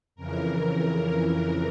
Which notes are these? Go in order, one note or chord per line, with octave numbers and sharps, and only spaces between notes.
F2 C#3 E3 A#4